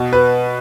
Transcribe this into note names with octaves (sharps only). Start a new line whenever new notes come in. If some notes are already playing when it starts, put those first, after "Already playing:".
Already playing: B2
B4